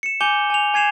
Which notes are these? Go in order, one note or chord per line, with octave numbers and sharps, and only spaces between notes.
C#7 E7
G#5 D6 G6 C#7 F7 G7
G#5 F7
G#5 G#6 C7 E7 F7